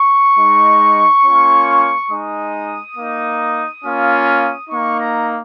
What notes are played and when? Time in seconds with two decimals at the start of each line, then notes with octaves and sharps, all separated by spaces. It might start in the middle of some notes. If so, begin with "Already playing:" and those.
Already playing: C#6
0.38 G#3 D#4
1.24 A#3 C#4 F4
2.10 G#3 D#4 D#6
2.97 A#3 D#4
3.83 A#3 C#4 F4
4.69 A#3 D#4 C#6
4.98 A#5